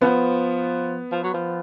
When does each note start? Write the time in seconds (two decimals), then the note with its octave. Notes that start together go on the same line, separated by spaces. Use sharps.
0.01 F3 B3
1.12 F3
1.24 F#3
1.34 F3